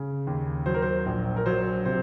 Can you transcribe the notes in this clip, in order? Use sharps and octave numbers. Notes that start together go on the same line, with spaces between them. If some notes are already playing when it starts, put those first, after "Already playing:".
Already playing: C#3
D#2
F#3 C5
A#4
C5
A#1
A#4
F#3 C5
C3 C5